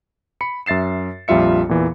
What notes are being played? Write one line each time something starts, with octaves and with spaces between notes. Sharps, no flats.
B5 C#7
F#2 E5 A6 C7 E7
A#1 F2 G3 F4 E5 C#7
E2 A#2 E3